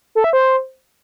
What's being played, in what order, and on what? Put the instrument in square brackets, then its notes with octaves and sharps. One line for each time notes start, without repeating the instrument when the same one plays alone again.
[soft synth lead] A4
E5
C5